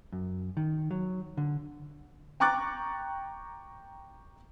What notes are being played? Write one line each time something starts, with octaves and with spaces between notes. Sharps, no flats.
F#2
D#3
F#3
D3
G5 A#5 C#6 D6 F#6 A6